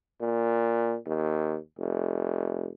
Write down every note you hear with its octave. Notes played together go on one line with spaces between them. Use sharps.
A#2
D#2
F1